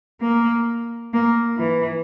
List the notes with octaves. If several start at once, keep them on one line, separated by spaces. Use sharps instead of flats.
A#3
A#3
E3